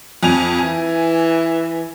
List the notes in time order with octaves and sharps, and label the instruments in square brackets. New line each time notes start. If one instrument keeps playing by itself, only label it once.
[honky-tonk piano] F2 G#5 F7
[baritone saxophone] E3 [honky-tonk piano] G#5